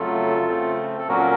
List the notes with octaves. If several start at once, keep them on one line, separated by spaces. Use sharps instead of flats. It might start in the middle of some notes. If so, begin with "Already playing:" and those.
Already playing: F2 C#3 F#3 A3 F4 A4
C#3 A3 C4
A4
A#2 F#3 A#3 C#4 F#4 A#4